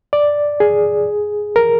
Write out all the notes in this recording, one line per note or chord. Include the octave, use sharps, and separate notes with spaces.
D5
G#4
A#4